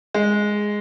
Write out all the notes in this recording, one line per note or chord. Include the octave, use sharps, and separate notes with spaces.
G#3